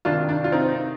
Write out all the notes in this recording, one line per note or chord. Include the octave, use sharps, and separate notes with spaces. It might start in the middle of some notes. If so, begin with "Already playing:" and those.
C3 D#3 D4 F4
D4
F4
C4 D#4